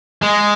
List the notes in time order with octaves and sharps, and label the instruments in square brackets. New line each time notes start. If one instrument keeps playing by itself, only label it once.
[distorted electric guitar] G#3